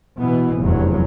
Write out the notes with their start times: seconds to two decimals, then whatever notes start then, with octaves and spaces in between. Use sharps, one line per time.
0.17 B2 E3 B3
0.58 F1 E2 G2 F#3